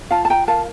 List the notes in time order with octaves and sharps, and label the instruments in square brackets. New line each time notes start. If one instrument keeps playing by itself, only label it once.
[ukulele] F4 F5 A5
A5
G5 A#5
A#4 F5 A5